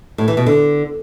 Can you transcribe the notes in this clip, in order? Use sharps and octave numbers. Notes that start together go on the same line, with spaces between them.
A2
E3
B2
D3